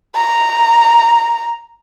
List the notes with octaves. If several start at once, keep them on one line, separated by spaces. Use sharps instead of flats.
A#5